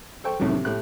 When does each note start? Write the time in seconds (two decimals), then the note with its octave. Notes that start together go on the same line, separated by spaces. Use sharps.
0.24 A4 C5 G5 C#6
0.40 C2 A2 C3 D#3 F#3
0.52 C3
0.65 A2 G4 F#6